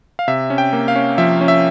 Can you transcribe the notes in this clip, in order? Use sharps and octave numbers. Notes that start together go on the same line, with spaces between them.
F5
C3 E5
C#4
G5
A#3
F5
C#4
F3 E5
C#4
E5